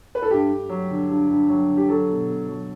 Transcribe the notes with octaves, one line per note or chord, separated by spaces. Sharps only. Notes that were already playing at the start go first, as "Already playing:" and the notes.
B4
A4
G2 G4
G2
F#3
D3
G2
G2
F#3
D3
G4
F#3 A4
B2
B2
F#3